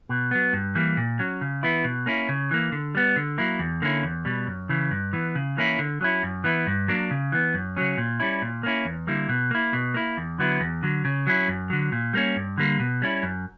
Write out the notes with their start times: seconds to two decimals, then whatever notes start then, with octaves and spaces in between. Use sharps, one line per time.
0.09 B2
0.31 F#3 B3
0.53 G2
0.75 E3 G3 A#3
0.97 A#2
1.19 F#3 C#4
1.41 C#3
1.63 E3 B3 E4
1.84 B2
2.06 A#3 C#4 E4
2.29 C#3
2.51 E3 A#3
2.72 D3
2.95 G3 B3
3.16 D3
3.38 F#3 A#3 E4
3.59 E2
3.82 D3 A#3 C#4 E4
4.03 E2
4.25 B2 G3
4.47 F#2
4.69 C#3 E3
4.91 G2
5.13 E3 B3
5.35 C#3
5.57 E3 A#3 C#4 E4
5.79 D3
6.01 F#3 C#4 E4
6.23 F#2
6.44 E3 B3 E4
6.67 G2
6.88 F#3 A#3 D4
7.11 C#3
7.32 E3 B3
7.54 F#2
7.77 C#3 F#3 C#4
7.98 A#2
8.20 G3 C#4 E4
8.42 A#2
8.63 A#3 C#4 E4
8.85 E2
9.07 D3 G3 A#3 E4
9.29 B2
9.51 A#3 E4
9.73 B2
9.94 A#3 E4
10.17 E2
10.38 D3 F#3 B3 E4
10.60 E2
10.83 D3 F#3
11.05 C#3
11.27 F#3 C#4 E4
11.48 F#2
11.70 D3 F#3
11.92 A#2
12.13 G3 A#3 C#4
12.36 G2
12.57 D3 G3 A#3
12.80 B2
13.02 G3 C#4 E4
13.23 F#2